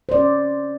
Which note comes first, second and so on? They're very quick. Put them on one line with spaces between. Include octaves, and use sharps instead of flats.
C5 D5 C#4